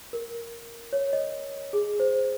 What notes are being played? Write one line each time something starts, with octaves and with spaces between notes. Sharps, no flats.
A#4
C#5
D#5
G#4
C5